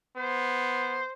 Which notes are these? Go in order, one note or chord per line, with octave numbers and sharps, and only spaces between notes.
B3 C5